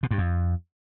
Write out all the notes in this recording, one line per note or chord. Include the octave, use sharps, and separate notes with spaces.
B2
G2
F2